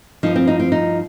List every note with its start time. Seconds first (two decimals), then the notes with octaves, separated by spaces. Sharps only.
0.23 G2 F3 D#4
0.36 C4
0.47 D#4
0.60 C4
0.72 D#4